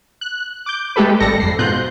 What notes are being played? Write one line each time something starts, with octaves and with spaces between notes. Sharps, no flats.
F#6
D6 G6
G#3 A3 G4 A4 B4
G#1 G3 A4 A#6 C#7
F2 C7
G#2 B2 F4 F#6 G6